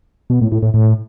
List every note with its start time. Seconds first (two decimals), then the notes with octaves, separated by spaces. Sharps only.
0.30 B2
0.41 A2
0.52 A2
0.62 A2
0.74 A2